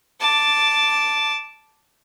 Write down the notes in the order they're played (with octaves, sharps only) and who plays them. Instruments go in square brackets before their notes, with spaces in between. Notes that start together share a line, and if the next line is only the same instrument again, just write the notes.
[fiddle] A5 D6